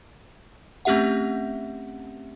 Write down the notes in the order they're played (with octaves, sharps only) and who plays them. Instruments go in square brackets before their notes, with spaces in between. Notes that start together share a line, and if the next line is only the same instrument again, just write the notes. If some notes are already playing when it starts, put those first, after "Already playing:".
[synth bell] A3 C4 C#4 G4 E5 F#5